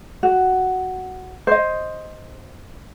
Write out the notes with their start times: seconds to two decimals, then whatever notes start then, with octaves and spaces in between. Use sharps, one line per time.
0.23 F#4
1.47 C5 D#5